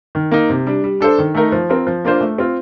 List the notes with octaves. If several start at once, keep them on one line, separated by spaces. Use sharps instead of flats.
D#3
A#3 D#4
C3
G3 D4
G3
D4 A4 C5
D#3
A3 D#4 A#4
F3
C4 F4 A#4
F3
A#3 D4 F4 C5
A3
C4 F4